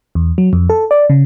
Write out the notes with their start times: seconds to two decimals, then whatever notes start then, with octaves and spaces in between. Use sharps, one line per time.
0.15 E2
0.38 F#3
0.53 F2
0.70 A4
0.91 D5
1.10 C#3